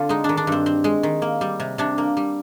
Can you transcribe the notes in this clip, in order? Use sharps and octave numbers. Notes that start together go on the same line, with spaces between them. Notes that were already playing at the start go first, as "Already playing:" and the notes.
Already playing: D3 C4 F4
G#3 D#4
D#3 D4
D4
G2 C4
C4
G#3
D#3
A#3
G3
C3
C3 D4
A#3
G3